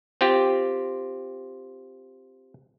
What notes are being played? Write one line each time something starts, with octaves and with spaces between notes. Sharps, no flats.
C4 F4 G4